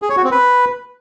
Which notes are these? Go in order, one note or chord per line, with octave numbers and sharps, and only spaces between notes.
G#4
C#5
F#4
C4
B4